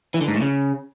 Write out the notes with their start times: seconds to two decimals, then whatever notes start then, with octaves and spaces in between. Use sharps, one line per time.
0.14 E3
0.21 D3
0.28 G#2
0.35 A2
0.42 C#3